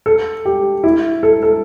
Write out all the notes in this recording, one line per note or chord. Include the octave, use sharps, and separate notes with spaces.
A4
G4
E4
A4
A4